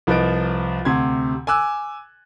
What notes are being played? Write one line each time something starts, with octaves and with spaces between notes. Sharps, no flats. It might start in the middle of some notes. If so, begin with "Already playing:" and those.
C2 F3 B4 D#5 D7
D2 C3 C6 G#6
G#5 D6 E6 F#6